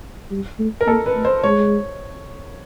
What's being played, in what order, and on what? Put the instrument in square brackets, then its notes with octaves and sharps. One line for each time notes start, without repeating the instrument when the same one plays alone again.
[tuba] G3
A3
[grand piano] A#4
[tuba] A#3 [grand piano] A4
[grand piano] B4
[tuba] A3
[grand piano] C5
[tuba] G#3 [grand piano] C#5